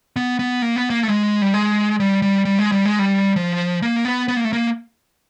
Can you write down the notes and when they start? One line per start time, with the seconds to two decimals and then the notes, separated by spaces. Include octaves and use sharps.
0.16 B3
0.39 B3
0.62 A#3
0.76 B3
0.90 A#3
1.03 A3
1.08 G#3
1.42 G3
1.54 G#3
2.00 G3
2.22 G3
2.45 G3
2.59 G#3
2.72 G3
2.85 G#3
2.99 G3
3.36 F3
3.82 A#3
4.05 B3
4.28 B3
4.36 A#3
4.44 A3
4.53 A#3